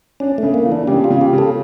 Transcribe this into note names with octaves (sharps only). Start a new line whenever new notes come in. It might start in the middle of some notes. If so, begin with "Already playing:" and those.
C#4 D4
C#3 A3
A#3
E3
D4
C#3 G4
F4
C#3
G4
C#3
A4